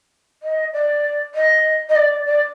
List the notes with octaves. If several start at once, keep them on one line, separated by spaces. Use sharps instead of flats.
D#5
D5
D#5
D#5
D5
D5